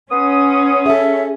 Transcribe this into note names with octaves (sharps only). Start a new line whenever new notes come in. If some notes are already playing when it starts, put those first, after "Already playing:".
B3 C#4 C6 D#6
G#4 A4 E5